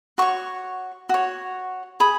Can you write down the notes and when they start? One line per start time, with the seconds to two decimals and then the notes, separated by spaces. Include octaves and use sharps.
0.18 F#4 C#5 C#6
1.09 F#4 C#5
2.00 G#4 B5